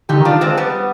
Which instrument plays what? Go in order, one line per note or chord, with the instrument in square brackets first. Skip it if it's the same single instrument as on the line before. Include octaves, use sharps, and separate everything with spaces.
[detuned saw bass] D3 [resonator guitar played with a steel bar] D#4 G4
[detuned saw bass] D#3
[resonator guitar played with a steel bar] D4 F4
G#3 C4
G3 B3